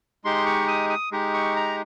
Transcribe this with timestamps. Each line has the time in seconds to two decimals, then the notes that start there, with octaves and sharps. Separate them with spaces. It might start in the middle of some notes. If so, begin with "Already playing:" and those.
0.25 G#3 D#4 G4 C6
0.46 C#6
0.68 D#6
0.90 D#6
1.12 G#3 D#4 G4
1.34 C#6
1.56 A#5